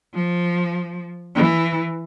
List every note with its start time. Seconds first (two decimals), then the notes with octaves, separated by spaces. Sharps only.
0.14 F3
1.35 E3